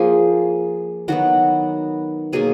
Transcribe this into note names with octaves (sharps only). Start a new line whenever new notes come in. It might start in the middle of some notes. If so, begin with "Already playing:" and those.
Already playing: F3 A#3 G#4 G#5
D#3 F#3 B3 F#4 F#5
B2 F#3 A#3 G#4 G#5